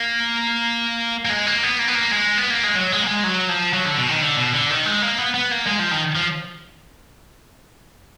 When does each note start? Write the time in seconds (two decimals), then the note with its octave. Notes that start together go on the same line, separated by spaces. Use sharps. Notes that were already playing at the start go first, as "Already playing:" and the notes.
Already playing: A#3
1.25 A#3
1.30 G#3
1.47 A#3
1.63 B3
1.79 A#3
1.88 B3
1.95 A#3
2.12 G#3
2.38 B3
2.50 A#3
2.63 G#3
2.75 F#3
2.92 G#3
3.03 A#3
3.08 G#3
3.24 F#3
3.49 F3
3.73 F#3
3.85 D3
3.98 B2
4.09 D#3
4.22 D3
4.37 B2
4.53 D3
4.70 D#3
4.86 G#3
5.02 A#3
5.18 B3
5.34 B3
5.51 A#3
5.67 G#3
5.79 F3
5.91 D#3
6.16 F3